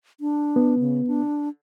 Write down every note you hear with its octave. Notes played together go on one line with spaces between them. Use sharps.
D4
B3
C#3
D4